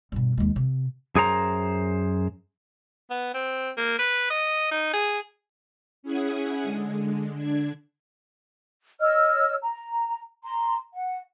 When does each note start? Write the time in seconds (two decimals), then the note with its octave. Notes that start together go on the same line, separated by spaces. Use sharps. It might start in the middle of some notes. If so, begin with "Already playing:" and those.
0.12 G2 B2
0.38 D#2 G#3
0.56 C3
1.16 F#2 G#4 A#4 C5 A#5
3.10 B3
3.34 C4
3.77 A#3
3.99 B4
4.30 D#5
4.71 D#4
4.93 G#4
6.03 C#4 E4 G#4 F#5 G#5 D#6
6.63 D3 G#3
7.32 D3 D4 G#6
9.00 C#5 D#5 E6 F6
9.62 A#5
10.43 A#5 C6
10.92 F#5